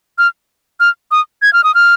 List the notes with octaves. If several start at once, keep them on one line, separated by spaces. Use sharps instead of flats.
F6
F6
D#6
G#6
F6
D#6
F6